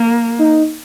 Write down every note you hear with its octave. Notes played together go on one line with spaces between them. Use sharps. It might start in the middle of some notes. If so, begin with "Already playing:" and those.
Already playing: A#3
D#4